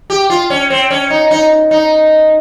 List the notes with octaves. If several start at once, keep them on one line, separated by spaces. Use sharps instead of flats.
G4
F4
C#4
C4
C#4
D#4
D#4
D#4